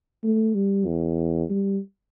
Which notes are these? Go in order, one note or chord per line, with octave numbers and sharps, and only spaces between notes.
A3
G3
E2
G3